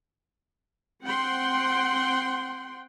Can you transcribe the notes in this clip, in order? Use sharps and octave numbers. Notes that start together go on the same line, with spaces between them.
C4 F#5 G5 C6